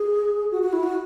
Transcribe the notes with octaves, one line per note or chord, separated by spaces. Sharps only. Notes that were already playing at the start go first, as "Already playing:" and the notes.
Already playing: G#4
F#4
F#4
E4
F#4